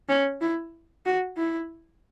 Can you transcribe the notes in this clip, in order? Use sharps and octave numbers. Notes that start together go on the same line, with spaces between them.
C#4
E4
F#4
E4